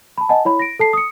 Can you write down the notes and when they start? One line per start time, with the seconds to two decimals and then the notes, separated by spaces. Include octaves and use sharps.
0.18 A5 B5
0.29 D#5 F#5 G#5 A5
0.45 E4 C#5 B5
0.59 A#6 D7
0.79 A4 A5 C7
0.93 D#6 C#7